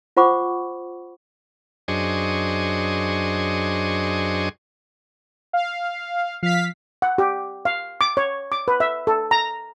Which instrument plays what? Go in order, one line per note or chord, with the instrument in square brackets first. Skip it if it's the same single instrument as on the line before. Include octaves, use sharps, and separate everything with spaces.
[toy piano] F4 C5 F#5 B5 C#6 D6
[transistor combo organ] F#2 D4 G#4 C5 D#5 C#6
[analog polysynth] F5
[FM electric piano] F3 [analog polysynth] F5 B6
[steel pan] F#5
G4
F5
D6
C#5
D6
B4
E5
A4
A#5